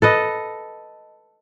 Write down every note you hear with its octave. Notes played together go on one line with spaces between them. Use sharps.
A4 B4 D#5